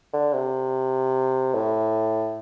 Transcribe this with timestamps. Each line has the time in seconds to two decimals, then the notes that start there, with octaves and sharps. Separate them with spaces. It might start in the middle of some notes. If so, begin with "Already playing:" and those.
0.13 D3
0.33 C3
1.54 A2